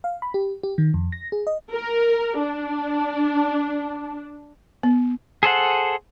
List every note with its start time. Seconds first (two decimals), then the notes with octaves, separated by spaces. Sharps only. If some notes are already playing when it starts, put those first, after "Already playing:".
0.04 F5
0.22 B5
0.34 G4
0.63 G4
0.78 D#3
0.94 F2
1.12 A#6
1.32 G#4
1.47 D#5
1.72 A#4
2.38 D4
4.83 B3
5.43 G#4 A4 C5 F#5